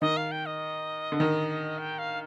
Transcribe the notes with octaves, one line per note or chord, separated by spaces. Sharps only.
D#3 D#5
F5
G5
D#5
D3
D#3
G5
F5